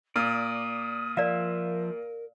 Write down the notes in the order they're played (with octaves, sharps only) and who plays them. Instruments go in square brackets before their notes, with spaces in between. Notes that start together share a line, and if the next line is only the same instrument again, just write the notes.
[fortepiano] A#2 [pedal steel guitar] D5 [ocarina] D#6
[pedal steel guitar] F3 E5 [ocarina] A#4 [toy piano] D5 F5